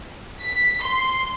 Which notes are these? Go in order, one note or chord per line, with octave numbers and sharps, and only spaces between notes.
B6
C6